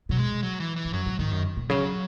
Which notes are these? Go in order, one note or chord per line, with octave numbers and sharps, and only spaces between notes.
B2 F#3
G#3
F#3
E3
E3
G#2
F#2 F#3
G#2
G#2 D#3
F#2
A#2
C#3 F#3